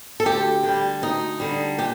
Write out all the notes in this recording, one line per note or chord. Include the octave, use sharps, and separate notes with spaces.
A4
D2 G4
D3 G3
D2 D#4
D3 G3
A#2 G4